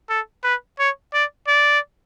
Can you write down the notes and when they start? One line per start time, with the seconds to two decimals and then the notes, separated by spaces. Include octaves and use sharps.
0.09 A4
0.44 B4
0.79 C#5
1.14 D5
1.47 D5